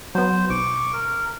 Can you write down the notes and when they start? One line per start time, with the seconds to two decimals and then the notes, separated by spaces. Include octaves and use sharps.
0.15 F#3 B3 C5
0.50 B1 C#6 D6
0.93 A#4